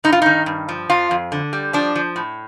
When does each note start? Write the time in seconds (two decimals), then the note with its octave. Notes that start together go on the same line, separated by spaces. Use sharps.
0.04 G2 D#4
0.12 F4
0.22 D#3 D#4
0.46 G2
0.69 F3
0.90 F2 F4
1.11 F2
1.32 D3
1.53 G3
1.73 F3 D4
1.95 F3
2.16 A2